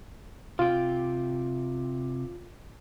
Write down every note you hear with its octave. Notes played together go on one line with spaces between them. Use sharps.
C3 F4 G5